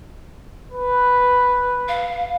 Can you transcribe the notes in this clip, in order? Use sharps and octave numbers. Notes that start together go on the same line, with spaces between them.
B4
F5